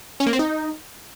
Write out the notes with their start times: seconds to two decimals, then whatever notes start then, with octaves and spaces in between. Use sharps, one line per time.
0.20 C#4
0.26 A#3
0.33 C4
0.39 D#4